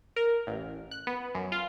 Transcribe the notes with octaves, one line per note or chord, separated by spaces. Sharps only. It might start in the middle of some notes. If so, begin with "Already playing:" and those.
A#4
A1
F#6
B3
F#2
F4